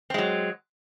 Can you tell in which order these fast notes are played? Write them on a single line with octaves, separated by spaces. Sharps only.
C4 G#3 F#3